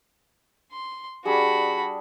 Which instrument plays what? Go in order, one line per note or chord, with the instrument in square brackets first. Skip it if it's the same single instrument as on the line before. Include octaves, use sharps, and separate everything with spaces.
[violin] C6
[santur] G3 D4 G#4 [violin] F#4 B5